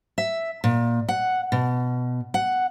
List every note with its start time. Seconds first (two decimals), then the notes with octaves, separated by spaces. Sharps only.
0.18 E5
0.64 A#2
1.09 F#5
1.52 B2
2.34 F#5